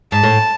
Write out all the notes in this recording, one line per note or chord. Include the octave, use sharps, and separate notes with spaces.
G#2 A5
A2